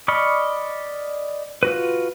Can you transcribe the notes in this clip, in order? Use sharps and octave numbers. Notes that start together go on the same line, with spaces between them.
D5 D#5 B5 C#6 F6
F4 F#4 B4